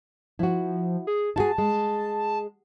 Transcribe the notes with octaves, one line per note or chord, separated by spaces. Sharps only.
F3 E4 F#4
G#4
E4 F#4 G#4 A5
G#3